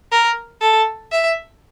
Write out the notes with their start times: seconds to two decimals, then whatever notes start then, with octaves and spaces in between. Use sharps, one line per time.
0.12 A#4
0.61 A4
1.12 E5